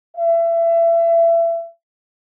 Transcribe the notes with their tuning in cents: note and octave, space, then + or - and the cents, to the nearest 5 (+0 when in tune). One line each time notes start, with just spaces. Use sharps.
E5 +30